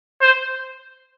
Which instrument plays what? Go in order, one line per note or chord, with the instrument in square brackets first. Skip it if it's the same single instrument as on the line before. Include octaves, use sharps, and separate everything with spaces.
[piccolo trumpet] C5